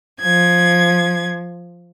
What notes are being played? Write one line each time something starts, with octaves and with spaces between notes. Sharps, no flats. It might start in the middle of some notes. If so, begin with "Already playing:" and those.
F3 G#6